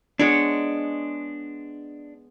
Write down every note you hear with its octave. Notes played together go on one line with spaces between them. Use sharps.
G#3 B3 D4 C#5